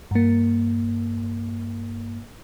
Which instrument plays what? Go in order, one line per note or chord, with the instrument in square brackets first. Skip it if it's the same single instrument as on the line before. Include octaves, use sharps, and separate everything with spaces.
[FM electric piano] G2 A#3